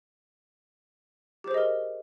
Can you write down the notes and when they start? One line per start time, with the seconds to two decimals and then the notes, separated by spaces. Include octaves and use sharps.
1.44 G4
1.48 C5
1.51 G#4
1.54 D#5
1.58 A#4